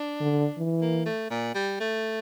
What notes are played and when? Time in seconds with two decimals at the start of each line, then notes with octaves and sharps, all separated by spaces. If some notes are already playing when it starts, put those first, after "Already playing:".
Already playing: D4
0.21 D3
0.58 E3
0.81 A#3
1.06 A3
1.30 A#2
1.55 G3
1.80 A3